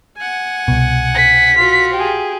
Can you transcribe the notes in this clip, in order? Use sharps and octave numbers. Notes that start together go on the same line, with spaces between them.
F#5 G#5
C2 B2
B6
F4 F#4
G4 G#4